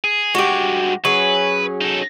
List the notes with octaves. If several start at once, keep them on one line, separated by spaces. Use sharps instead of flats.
G#4
G2 G#3 F#4 G4
F#3 C#4 G#4 B4
D#4 A4